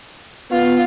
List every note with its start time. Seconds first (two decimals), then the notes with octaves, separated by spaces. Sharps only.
0.52 B3 F4